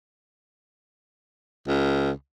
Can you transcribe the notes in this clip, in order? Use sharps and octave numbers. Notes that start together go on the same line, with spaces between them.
C#2